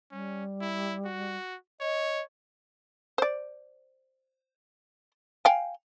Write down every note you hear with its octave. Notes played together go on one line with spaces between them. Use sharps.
G3 C#4
E4
F#4
C#5 D#5
C5 D5
F5 G5 G#5